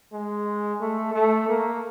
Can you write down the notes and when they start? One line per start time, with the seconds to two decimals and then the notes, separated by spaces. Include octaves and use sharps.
0.12 G#3
0.81 A3
1.14 A3
1.49 A#3